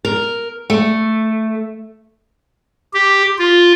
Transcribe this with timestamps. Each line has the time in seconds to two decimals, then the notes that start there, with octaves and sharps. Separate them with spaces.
0.05 A#4
0.70 A3
2.94 G4
3.38 F4